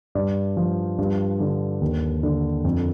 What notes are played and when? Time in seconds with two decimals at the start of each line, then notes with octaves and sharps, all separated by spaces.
0.15 G2 D5
0.57 F3
0.98 G2
1.40 D3
1.82 D#2
2.23 D3
2.65 F2